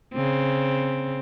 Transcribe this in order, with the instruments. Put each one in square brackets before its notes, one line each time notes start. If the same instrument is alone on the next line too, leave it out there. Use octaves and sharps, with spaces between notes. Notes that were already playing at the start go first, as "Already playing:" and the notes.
[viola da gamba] C#3 C4